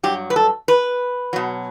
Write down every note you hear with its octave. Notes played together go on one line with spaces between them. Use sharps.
G2 F#3 G4
B4
A4
B4
B2 F#3